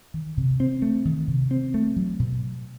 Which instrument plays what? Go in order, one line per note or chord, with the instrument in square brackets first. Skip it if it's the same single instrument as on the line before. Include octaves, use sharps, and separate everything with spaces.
[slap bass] D#3
C3
C4
A3
D#3
C3
C4
A3
F#3
B2